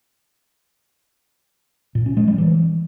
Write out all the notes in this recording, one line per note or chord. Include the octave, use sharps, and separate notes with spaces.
A#2
C#4
G#3
G3
E3